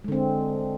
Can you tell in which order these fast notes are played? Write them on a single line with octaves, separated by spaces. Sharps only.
G#3 D3 C4